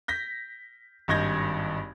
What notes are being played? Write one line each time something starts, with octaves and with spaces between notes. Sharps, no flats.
G6 A#6 B6
G#1 G2 D#5 G6 G#6 A#6